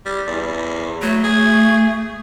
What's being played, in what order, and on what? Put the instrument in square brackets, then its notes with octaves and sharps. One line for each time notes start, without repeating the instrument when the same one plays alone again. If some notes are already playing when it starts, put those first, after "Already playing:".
[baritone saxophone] G3
E2
[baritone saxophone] F#3 [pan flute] A3
[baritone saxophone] G#4